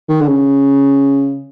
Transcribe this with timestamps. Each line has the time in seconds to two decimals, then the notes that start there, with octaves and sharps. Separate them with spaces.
0.09 D#3
0.21 D3
0.28 C#3